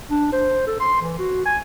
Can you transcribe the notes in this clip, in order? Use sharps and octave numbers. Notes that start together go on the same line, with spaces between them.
D4
C5
A4
C6
E3
F#4
G#5